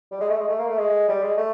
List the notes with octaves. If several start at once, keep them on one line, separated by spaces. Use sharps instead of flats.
G3
G#3
A3
G#3
A3
A#3
A3
G#3
G3
G#3
A3